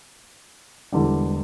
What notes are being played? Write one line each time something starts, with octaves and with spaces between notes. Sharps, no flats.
E1 E2 D3 G3